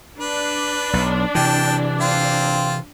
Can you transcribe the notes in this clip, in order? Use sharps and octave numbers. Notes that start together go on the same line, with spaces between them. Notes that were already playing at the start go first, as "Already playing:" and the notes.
D4 B4
B1
C3 E3 G5 A5
C4 F4